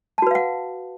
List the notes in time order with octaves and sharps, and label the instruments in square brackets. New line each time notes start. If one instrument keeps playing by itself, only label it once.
[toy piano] A5
F#4
B4
F5
F#5